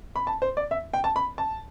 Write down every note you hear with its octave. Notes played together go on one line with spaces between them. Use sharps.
B5
A5
C5
D5
E5
G5
A5
B5
A5